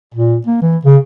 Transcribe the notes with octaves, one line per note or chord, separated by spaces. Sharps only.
A#2
A#3
E3
C#3